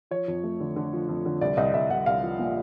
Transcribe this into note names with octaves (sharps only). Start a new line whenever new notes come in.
F3 C#5
F2
A3
D3
D3
F3
F2
D3
C2 D5
C2 D#5
C2 E5
C2 F#5
C2 F5
F3
A#2